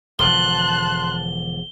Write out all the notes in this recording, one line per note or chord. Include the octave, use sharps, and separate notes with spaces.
E1 D3 F3 A5 C6 F#6 G7